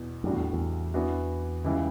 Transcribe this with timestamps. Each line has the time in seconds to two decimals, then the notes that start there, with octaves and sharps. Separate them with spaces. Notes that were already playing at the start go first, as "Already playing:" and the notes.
Already playing: E2 B2
0.24 F#2 A2 G3 D4 F#4
0.33 E2
0.53 E2
0.94 E3 B3 D4 F#4
1.64 C#2 C#3 E3 G3